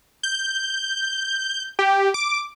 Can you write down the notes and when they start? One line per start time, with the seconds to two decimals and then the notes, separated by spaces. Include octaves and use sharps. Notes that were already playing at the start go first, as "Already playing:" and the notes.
0.23 G6
1.79 G4
2.14 D6